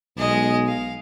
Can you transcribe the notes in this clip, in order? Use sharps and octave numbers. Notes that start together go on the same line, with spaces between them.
B1 G#3 D#5
F5